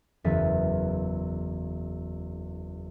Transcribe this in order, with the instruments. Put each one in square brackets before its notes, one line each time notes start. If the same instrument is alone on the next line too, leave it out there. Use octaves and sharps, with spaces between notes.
[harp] F#1 E2 E3 G#4 A6 B6